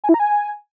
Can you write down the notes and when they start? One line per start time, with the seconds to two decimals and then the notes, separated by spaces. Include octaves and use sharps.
0.04 G#5
0.09 E4
0.14 A#5
0.19 G#5